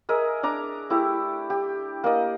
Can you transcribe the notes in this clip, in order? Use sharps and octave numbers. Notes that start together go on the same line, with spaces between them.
G#4 A#4 D#5 E5
D4 D5 A#5 D6
A3 E4 G4
G4
A#3 D5 D#5